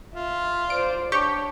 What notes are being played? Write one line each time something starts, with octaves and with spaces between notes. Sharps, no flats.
F4 E5
C5 D5 D7
D4 G4 C#5 C#6